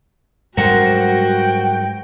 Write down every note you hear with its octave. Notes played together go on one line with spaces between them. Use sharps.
G#2 F#3 G3 F#4 A#4 C5 F#5 G5